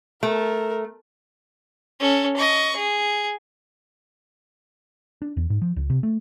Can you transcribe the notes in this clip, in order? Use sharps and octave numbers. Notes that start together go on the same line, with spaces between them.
A3 A#4
C#4 A4
D#5 C#6
G#4
D4
E2
G#2
F3
C#2
C3
A3